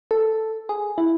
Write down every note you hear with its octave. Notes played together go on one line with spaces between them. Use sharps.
A4
G#4
E4